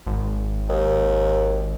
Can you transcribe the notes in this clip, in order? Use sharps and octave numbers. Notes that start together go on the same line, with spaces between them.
G#1
D#2